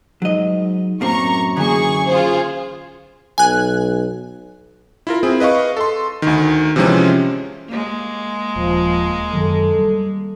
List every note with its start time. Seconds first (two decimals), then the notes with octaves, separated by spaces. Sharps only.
0.22 G#2 F#3 D#5
1.01 F#2 A2 A#3 C4 A#5 C#6
1.57 D3 E3 A#3 G#4 C#6
2.08 F4 G#4 C5
3.38 B1 G#5 F#6
5.07 E4 F4 A#4
5.23 C4 E4 G#4
5.40 B4 D#5 F5 C#6
5.77 A4 C6
6.22 D2 D#3
6.76 C3 E3 F3 G#3 C4 C#4
7.68 G#3 A#3
8.56 D#1 F3
9.33 F#2 D#3 F#3 A4
9.78 G3